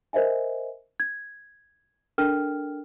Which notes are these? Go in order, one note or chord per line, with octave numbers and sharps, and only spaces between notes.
A#4 C5 D#5 E5 G#5
G#6
D4 A4 A#4 G5 F6